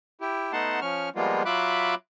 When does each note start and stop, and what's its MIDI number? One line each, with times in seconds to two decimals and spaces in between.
0.21 0.52 64
0.21 0.52 67
0.52 0.80 57
0.52 0.80 59
0.52 0.80 63
0.52 0.80 78
0.52 0.80 81
0.52 0.80 84
0.81 1.09 53
0.81 1.09 61
0.81 1.09 85
0.81 1.09 89
1.16 1.43 53
1.16 1.43 55
1.16 1.43 56
1.16 1.43 58
1.16 1.43 59
1.16 1.43 65
1.45 1.95 54
1.45 1.95 65
1.45 1.95 76
1.45 1.95 83
1.45 1.95 86
1.45 1.95 90